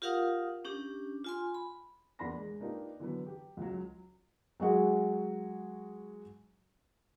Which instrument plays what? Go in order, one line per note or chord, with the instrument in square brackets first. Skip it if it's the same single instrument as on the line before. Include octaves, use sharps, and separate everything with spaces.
[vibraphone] F4 G4 A#4 F5 F#5 D#6
C#4 D4 G4
F4 G#5 C6
B5
[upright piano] E2 A#3 D4 B5 C6 A#6
G#3
A#3 D4 D#4 F4 G4 B4
D3 E3 F#3 B3
G4
C#2 F#3
[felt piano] F#3 G#3 F#4 G#4